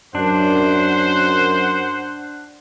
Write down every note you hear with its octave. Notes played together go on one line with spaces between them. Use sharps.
F#2 D4 C5 F#5